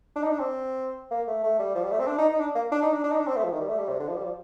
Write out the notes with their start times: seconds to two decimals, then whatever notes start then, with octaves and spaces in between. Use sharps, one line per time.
0.16 D4
0.23 D#4
0.32 D4
0.40 C4
1.11 A#3
1.28 A3
1.43 A3
1.59 G3
1.75 F3
1.84 G3
1.92 A3
2.00 C4
2.07 D4
2.18 D#4
2.30 D#4
2.40 D4
2.55 A#3
2.72 D4
2.82 D#4
2.93 D4
3.04 D4
3.11 D#4
3.20 D4
3.27 C4
3.36 A3
3.44 F3
3.52 D#3
3.60 G3
3.69 A3
3.79 G3
3.89 C3
4.00 D3
4.08 F3
4.17 G3
4.24 F3